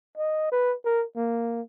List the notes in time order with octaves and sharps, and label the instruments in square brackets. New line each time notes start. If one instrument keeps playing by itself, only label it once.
[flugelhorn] D#5
B4
A#4
A#3